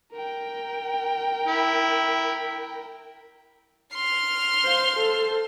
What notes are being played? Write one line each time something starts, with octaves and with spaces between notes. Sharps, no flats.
A#4 G5
E4
C6 F6
C5 F5
A4 C5